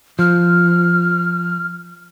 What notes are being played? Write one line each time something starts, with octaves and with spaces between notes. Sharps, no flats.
F3 F6